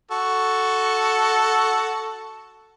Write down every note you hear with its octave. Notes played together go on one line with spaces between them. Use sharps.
F#4 A4